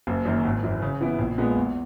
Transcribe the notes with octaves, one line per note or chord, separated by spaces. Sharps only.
F#1
F#2 D#3 A#3
G#1
F#2 E3
C#3
E3 B3 E4
A#1
A#2 G#3 B3
E2